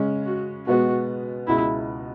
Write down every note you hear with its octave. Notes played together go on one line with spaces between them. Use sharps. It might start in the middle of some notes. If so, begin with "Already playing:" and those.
Already playing: C#3 G#3 C#4
F#4
B2 G#3 B3 F#4
C#2 B2 G#3 E4